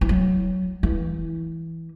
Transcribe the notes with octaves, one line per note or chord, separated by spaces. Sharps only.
E3
F#3
E3